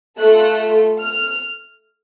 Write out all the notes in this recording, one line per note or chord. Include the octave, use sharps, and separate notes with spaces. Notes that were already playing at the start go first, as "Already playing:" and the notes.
A3 F4 A4 F#6
F6